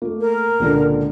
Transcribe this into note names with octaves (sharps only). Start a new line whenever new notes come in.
A3 A#3
A#4
C#2 A#2 D3